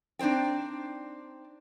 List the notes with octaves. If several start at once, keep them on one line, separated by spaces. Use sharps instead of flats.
C4 D4 D#4 C5 G5